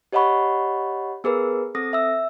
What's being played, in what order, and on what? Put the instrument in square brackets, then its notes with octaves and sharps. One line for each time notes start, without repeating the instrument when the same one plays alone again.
[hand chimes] G4 C#5 D#5 F#5 B5 C#6
B3 G#4 A#4 B4
C4 A4 D#6 A#6
E5 E6